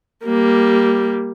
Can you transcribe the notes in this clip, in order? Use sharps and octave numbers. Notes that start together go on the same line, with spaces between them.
G3 A#3